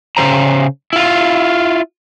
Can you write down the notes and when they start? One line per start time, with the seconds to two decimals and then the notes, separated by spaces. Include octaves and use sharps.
0.17 C#3 E3 C5 A#5
0.93 E4 F4